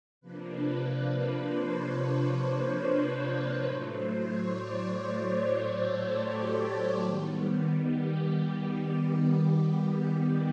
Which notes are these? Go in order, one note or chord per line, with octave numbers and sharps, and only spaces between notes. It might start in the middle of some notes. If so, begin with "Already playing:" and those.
C3 F3 A#3 D4 B4
B4
B4
B4
C5
C#5
B4
C5
B4
A2 F#3 A3 B4
C5
C#5
D5
C5
C5
A4
G4
D#3 G3 B3
G4